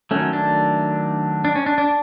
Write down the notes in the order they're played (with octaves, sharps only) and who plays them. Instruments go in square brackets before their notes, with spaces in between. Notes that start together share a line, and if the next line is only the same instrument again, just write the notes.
[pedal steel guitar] D#3 F#3 A3 C#4
D4
D4
C#4
D4
D4